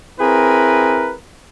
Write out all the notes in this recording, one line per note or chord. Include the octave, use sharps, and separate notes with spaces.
C4 E4 G#4 A#4 B4